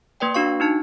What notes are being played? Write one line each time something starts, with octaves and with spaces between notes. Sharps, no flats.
A#3 B4 D5 G5
D4 F#4 F5 C#6
D4 D#4 A5